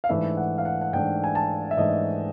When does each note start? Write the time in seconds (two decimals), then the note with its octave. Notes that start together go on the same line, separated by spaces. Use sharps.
0.04 F5
0.09 G#2 E3 A3 D4 E5
0.37 F#5
0.58 F5
0.65 F#5
0.81 F#5
0.93 G#2 E3 A3 D4 G5
1.24 G#5
1.35 A5
1.71 E5
1.77 G#2 E3 A3 D4 D#5